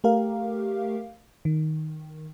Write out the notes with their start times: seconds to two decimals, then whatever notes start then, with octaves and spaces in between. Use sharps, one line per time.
0.04 A3 G4 A#4 F5
1.45 D#3